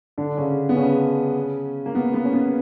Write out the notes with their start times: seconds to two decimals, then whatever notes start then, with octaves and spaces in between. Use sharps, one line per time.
0.18 D3 D4
0.37 C#3 C#4
0.69 B3
0.76 C#3 C#4
1.86 A#3
1.95 B3
2.14 B3
2.25 C#4
2.34 B3